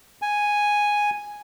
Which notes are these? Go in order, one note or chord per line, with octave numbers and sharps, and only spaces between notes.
G#5